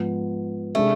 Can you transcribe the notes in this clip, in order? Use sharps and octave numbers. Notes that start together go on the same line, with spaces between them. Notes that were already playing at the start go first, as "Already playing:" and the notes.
Already playing: G#2 F3 B3
C3 G#3 A3 D4 G#4